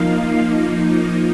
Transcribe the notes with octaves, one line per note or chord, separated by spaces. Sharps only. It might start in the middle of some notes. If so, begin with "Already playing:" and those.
Already playing: F3 A#3 D#4 F5